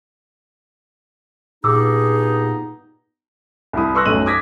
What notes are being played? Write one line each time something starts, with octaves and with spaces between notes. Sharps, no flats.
G2 A#2 B3 D#4 G#4 D6 E6
C2 E4 D#6
B4 C6 C#6 E6 F#6 A#6
B1 F#2 A3 D#5 D#7 F#7
D6 D#6 G#6 A#6 B6